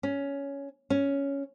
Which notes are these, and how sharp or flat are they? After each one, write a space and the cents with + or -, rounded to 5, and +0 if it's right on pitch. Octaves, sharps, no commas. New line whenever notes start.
C#4 +10
C#4 +5